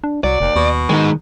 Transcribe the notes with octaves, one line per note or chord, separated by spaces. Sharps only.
D4
C2 F#3 D5
F1 D#2
D#2 B2
D#3 G#3 D#4